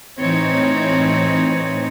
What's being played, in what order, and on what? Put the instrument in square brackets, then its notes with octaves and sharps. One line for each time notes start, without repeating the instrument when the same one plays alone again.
[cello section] A2 E3 C4 D#4 C#5